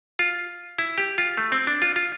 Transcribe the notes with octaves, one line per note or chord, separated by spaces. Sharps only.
F4
E4
G4
F4
A3
C4
D4
F4
F4